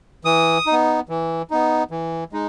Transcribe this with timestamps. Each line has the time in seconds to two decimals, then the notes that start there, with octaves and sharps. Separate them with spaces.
0.25 E3 D#6
0.66 D#4
0.72 B3
1.09 E3
1.51 B3 D#4
1.91 E3
2.32 G#3 D#4